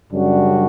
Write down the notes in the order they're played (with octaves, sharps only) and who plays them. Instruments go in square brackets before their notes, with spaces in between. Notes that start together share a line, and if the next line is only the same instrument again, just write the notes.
[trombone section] F#2 C#3 G3 D4 F#4